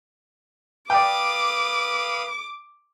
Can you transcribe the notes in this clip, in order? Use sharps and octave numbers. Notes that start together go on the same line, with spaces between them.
B4 D5 F5 G5 D6 D#6